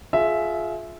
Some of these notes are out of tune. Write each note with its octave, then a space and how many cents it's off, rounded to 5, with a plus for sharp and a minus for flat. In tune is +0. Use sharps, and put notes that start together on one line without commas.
F4 +15 G#4 +30 E5 +0